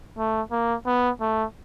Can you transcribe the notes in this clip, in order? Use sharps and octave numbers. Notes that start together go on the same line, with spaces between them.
A3
A#3
B3
A3